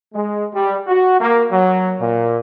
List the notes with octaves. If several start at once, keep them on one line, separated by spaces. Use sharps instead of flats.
G#3
G3
F#4
A#3
F#3
A#2